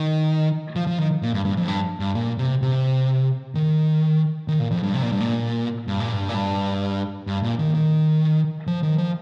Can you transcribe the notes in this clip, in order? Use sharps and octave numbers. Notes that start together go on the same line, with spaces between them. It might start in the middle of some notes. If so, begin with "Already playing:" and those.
Already playing: D#3
F3
F3
D#3
A#2
G2
G2
F2
G2
G2
A#2
C3
C3
D#3
D#3
A#2
F2
G2
C3
A#2
G2
A#2
G2
A#2
G2
A#2
G2
G2
A#2
D#3
D#3
F3
D#3
F3